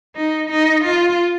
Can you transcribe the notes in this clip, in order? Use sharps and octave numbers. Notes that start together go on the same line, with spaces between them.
D#4
D#4
F4